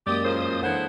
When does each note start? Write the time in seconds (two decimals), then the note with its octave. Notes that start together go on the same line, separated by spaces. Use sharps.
0.07 F#2 G#3 A#3 G4 D5 D#6
0.25 A#2 C#3 A#4 C5
0.63 E3 D4 E4 A4 C5 F#5